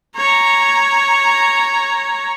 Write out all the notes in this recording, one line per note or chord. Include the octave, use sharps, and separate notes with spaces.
C#5 A#5